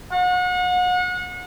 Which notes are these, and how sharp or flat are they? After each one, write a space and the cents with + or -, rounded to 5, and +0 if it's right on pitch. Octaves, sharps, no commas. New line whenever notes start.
F#5 -35